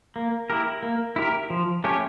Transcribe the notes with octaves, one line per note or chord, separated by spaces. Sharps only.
A#3
E4 G4 A#4
A#3
E4 G4 A#4
F3
A3 C#4 G4 C#5